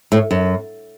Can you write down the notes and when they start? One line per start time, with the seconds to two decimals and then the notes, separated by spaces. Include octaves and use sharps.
0.12 A2
0.31 F#2